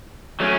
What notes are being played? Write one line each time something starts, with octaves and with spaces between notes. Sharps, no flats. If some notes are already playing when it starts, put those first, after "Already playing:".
F#3 A3 C#4